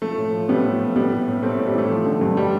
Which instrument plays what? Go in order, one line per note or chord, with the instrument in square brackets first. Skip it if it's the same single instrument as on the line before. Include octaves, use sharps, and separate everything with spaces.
[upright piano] F3 A3
A2
F3
A2 G3 B3
F3
A2
A2 G3 B3
A2
A2
A2 A3 C4
A2
G3
E3 A3
F3
D3
G2
G3